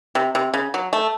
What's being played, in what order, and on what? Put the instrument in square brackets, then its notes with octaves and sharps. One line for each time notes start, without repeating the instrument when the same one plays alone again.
[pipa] C3
C3
C#3
F#3
A3